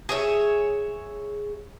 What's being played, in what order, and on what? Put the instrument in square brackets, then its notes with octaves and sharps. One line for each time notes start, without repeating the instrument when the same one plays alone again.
[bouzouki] G#4 C#5 E5